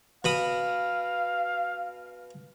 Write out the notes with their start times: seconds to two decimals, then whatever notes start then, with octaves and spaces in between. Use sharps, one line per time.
0.24 B2 F5 B5 D#6